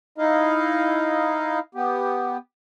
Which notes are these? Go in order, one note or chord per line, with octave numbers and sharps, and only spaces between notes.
D#4 E4 D#5 F5
B3 G4